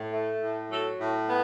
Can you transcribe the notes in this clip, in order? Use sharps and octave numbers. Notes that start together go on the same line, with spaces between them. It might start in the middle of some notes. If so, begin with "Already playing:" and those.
Already playing: A2
A3
A2
F#3 A4
A2
B3